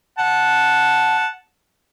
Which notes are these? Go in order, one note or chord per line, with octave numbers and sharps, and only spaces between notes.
F#5 A5